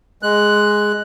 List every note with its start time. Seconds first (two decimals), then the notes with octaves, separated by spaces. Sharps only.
0.23 G#3 F#6